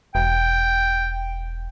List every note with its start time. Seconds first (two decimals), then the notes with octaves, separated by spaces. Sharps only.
0.15 E1 G5